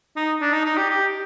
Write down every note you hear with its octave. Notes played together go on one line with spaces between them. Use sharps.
D#4
D4
D#4
D#4
G4
G4